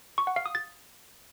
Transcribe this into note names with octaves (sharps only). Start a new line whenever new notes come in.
C#6
F#5
F5
D#6
A6